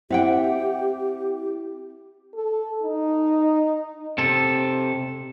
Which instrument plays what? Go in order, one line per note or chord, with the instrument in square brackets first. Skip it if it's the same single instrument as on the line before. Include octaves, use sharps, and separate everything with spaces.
[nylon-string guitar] C4 [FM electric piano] E4 [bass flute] G4 [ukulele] E5 F#5 G5
[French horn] A4
D#4
[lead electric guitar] C3 A4